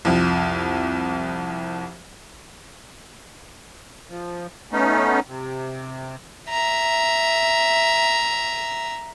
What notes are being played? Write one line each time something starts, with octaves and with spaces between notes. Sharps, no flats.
C2 F2
F3
A3 B3 C#4 D#4
C3
E5 A#5